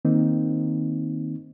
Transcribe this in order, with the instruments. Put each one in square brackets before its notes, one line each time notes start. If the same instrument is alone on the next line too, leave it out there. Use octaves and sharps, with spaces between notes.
[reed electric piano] D#3 A#3 C4 D#4